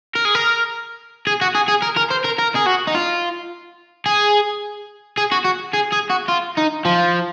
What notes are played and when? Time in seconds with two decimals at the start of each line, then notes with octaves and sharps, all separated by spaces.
0.15 A#4
0.25 G#4
0.35 A#4
1.27 G#4
1.42 F#4
1.55 G#4
1.68 G#4
1.83 A#4
1.97 A#4
2.11 C5
2.25 A#4
2.39 A#4
2.56 G#4
2.67 F#4
2.88 D#4
2.95 F4
4.06 G#4
5.18 G#4
5.32 F#4
5.45 F#4
5.74 G#4
5.93 G#4
6.10 F#4
6.29 F4
6.58 D#4
6.85 F3